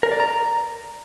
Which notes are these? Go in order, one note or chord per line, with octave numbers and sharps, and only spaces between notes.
A#4
D5
A#5